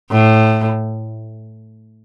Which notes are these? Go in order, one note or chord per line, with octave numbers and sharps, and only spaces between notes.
A2